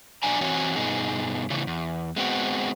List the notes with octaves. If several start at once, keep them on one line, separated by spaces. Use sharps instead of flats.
B2 F#3 D4 D5 G#5 A#5
E3 C4 F#4 C#5 G#5
G2 B2 B3 D#4 G#4
A2 C#3 E3
E2
G#3 B3 C4 F#4